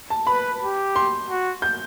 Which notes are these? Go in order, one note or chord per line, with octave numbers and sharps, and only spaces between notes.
A5
B4 B5
G4
C6
F#4
G6